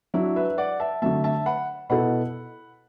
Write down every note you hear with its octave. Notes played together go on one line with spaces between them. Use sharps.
F#3 D4 E4 F#4
B4 E5
D5 F#5
E5 A5
D3 F#3 A3 E5 A5
E5 A5
F#5 B5
B2 B3 E4 A4 F#5 B5